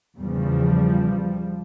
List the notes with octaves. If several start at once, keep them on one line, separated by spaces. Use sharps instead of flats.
E2 C#3 F3 G3